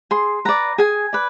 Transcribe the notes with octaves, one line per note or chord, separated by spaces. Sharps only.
G#4 C6
B4 D5 A#5
G#4 G#5
B4 D5